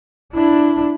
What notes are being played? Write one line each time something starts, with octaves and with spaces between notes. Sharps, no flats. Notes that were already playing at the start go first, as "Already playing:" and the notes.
D4 E4